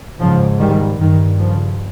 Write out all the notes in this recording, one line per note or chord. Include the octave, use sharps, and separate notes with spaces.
G#2 C#3 F3
D#3 G3
G2 D#3
C#3 F3